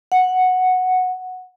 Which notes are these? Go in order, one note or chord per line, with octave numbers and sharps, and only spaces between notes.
F#5